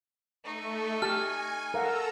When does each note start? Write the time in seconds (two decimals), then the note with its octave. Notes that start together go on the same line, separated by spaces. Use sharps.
0.45 A3 D#4 C#6
1.02 G4 G#5 A5 F6
1.74 A4 A#4 F5 F#5 A#5 E6